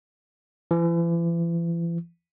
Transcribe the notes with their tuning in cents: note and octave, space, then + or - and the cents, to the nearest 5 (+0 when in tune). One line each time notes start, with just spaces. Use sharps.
E3 +40